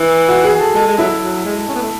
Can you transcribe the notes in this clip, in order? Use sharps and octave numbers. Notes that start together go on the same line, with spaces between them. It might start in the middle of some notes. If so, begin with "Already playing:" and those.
Already playing: E3
F#4
G#4
A4
G#3 A4
G#3
F#3 E4
F#3
G#3
C#4
B3
A3